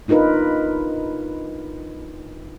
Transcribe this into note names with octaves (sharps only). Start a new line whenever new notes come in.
D4 D#4 F4 A#4 B4